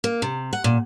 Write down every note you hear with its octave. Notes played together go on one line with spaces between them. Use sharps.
A#3
C3
F#5
A#2